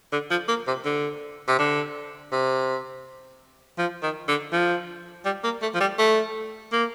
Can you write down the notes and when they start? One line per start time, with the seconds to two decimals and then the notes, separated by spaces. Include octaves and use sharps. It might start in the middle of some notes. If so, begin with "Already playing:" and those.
0.12 D3
0.31 F3
0.48 A#3
0.68 C3
0.85 D3
1.48 C3
1.59 D3
2.32 C3
3.79 F3
4.03 D#3
4.28 D3
4.53 F3
5.26 G3
5.44 A#3
5.62 A3
5.74 F3
5.81 G3
5.99 A3
6.72 A#3